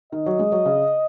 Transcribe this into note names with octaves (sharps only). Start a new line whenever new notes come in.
D#3 D#5
F#3
G#3
F#3
C#3